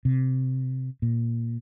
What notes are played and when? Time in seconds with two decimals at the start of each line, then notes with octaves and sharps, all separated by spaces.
0.05 C3
1.02 A#2